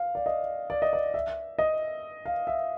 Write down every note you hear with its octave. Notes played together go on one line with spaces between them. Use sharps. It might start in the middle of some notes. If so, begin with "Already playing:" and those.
Already playing: F5
D5
D#5
D5
D#5
D5
E5
D#5
F5
E5